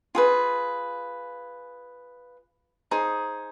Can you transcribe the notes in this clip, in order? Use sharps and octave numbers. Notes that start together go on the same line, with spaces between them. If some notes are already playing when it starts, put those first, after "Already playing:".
F4 G#4 B4
D#4 G#4 C5